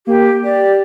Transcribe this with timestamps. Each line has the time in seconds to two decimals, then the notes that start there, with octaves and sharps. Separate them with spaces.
0.07 A#3 G4
0.44 G4 D5